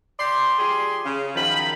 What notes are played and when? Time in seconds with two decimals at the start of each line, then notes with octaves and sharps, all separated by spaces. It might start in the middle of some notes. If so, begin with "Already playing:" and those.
0.19 G4 D5 C6
0.59 F3 G4 G#4 C6
1.05 C#3
1.36 F#2 D#3 F3 B5